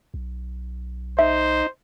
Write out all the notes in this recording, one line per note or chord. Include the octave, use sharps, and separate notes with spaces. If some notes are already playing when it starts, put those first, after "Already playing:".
B1
D#4 C5 E5